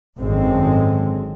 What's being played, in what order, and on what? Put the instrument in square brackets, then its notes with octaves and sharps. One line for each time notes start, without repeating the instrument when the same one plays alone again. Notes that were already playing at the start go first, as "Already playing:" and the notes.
[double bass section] G#1 F#2 D3 G#3 C4